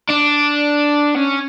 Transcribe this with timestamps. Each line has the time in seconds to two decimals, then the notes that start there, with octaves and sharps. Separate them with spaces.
0.10 D4
1.16 C#4